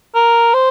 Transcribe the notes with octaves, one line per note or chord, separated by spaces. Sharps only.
A#4
C5